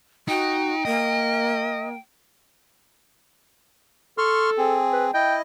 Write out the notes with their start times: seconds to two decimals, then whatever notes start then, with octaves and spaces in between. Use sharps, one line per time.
0.28 D#4 F#4 G5
0.85 A#3 D#5
4.18 A4 C6 C#6 F6
4.58 C4 G#4
4.93 B4
5.14 E4 D#5 G5